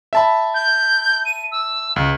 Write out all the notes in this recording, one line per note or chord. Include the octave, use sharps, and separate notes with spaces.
E5 A5 B5
G6
D#7
E6
C#2